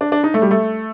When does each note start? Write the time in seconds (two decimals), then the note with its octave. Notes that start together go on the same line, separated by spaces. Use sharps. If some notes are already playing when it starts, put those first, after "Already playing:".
0.01 D4
0.12 D4
0.24 D#4
0.34 A3
0.42 G3
0.51 A3